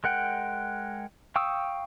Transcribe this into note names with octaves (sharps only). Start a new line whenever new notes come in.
G#3 A#4 F#5 G5
F5 G5 C#6 D#6 E6